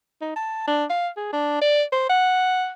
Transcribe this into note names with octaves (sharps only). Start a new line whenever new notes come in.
D#4
A5
D4
F5
G#4
D4
D5
C5
F#5